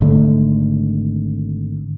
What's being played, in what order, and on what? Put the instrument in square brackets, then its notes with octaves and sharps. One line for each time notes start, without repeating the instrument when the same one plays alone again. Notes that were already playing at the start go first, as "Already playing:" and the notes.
[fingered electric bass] G#1 D3 A3